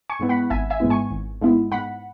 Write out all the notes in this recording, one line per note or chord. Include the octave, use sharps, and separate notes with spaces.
G#5 C#6
G#2 G#3 B3 E4
F#5 B5
G#1 E5 G#5
E5 G#5
G#2 G#3 B3 E4
G#5 C#6
G#1
G#2 G#3 B3 E4
G#2 F#5 B5